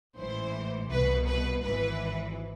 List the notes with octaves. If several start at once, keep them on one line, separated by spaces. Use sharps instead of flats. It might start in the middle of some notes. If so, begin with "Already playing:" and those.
A1 G#2 E3 C5
C2 B2 B4
B4
G#1 G#2 E3 B4